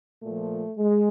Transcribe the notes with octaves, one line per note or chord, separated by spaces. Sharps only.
A#2 F3 A3
G#3